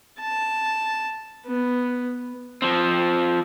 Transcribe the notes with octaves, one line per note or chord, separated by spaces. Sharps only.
A5
B3
F3 C4